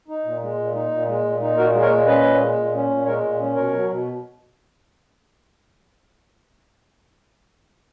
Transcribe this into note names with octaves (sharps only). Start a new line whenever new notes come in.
D#4
A#2
G#3
A#2
D#4
A#2
G#3
A#2
D#4
A#2 F#4 A#4
G#3
A#4 C#5
A#2
C#4 B4 D#5
A#2
G#3
A#2
C#4
A#2
G#3 A#4 C#5
A#2
C#4
B2 A#4 C#5
F#3
B2